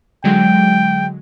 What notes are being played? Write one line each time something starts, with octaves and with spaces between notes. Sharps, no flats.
D3 F#3 G#3 G5